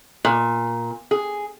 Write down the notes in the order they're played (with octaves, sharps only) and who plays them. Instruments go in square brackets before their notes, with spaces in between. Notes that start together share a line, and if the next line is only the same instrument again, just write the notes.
[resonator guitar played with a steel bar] A#2
G#4